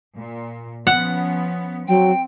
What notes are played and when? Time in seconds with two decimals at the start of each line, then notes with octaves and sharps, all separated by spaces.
0.17 A#2
0.87 F3 B3 C#4 F#5
1.88 F#3 C4 G5